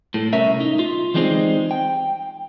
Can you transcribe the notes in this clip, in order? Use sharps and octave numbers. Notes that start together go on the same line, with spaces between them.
A2 A4
C2 C#4 A#4 E5
D#4
F4
E3 G3 G#3 C4 D#4 C5
G5